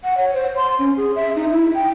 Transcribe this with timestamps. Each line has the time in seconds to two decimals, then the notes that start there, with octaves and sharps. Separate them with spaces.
0.04 F#5
0.18 C#5
0.34 C5
0.56 C6
0.79 C#4
0.97 G#4
1.16 E5
1.36 D#4
1.51 E4
1.75 G5